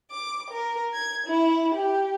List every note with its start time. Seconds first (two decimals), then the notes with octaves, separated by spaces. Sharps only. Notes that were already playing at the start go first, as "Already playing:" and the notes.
0.10 D6
0.51 A#4
0.94 G#6
1.27 E4
1.74 G4